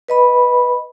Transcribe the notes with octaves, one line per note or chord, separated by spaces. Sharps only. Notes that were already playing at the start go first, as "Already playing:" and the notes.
B4 D#5 B5